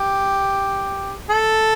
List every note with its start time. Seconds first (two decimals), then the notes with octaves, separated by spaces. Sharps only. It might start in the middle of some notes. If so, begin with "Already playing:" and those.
Already playing: G4
1.30 A4